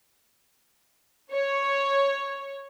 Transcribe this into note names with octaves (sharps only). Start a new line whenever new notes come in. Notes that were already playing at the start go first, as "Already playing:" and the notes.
C#5